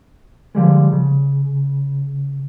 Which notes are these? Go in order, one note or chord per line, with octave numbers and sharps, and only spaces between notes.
D3 F3 G3 G#3
C#3